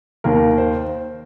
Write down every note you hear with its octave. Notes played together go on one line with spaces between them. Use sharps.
D#2 D#3 A#3 A#4
C5